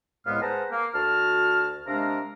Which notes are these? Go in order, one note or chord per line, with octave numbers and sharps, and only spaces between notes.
C2 A2 G#3 B3 F5 F6
G#4 B4 C5 F#5 A5 A#5
A#3
D2 F#4 A5 F6
C3 G#3 D4 A#4 F5 A#5